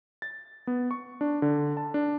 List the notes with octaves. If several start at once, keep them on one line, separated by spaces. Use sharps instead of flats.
A6
B3
C#6
D4
D3
A5
D4